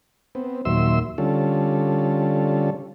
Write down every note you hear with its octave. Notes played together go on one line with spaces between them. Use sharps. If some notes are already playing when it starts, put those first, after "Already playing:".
B3 C4
D#2 A#2 F#3 E5 C6 E6
D3 G3 C#4 F4 A4